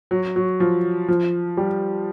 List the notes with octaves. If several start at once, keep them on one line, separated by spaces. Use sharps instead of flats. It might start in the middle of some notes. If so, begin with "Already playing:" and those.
F#3
F#3
F3
F3
G3